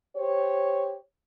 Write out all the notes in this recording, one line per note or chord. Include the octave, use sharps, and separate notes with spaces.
G4 C5 C#5